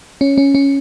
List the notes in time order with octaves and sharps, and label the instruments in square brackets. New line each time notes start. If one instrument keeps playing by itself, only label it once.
[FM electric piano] C#4
C#4
C#4